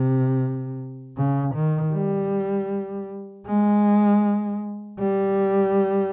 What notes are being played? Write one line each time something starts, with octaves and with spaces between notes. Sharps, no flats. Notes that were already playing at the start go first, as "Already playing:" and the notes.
Already playing: C3
C#3
D#3
G3
G#3
G3